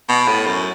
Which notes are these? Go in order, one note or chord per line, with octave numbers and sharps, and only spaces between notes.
B2
A2
F#2